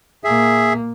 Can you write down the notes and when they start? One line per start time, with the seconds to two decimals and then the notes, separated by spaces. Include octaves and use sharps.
0.24 A#2 A#3 G#4 E5